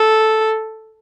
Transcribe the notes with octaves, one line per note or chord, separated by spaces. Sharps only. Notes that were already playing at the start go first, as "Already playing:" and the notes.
Already playing: A4